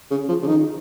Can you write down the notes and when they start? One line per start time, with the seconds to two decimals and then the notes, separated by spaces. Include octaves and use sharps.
0.11 C#3
0.28 F3
0.42 C#3
0.47 D#3